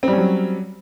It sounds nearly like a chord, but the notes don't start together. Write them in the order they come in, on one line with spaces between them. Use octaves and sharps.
C4 G3 C#4 F#3